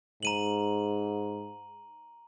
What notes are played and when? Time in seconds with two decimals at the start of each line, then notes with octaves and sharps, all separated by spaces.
0.23 G#2 A#5 D#7 F#7